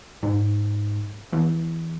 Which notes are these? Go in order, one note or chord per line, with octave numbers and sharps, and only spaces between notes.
G#2
E2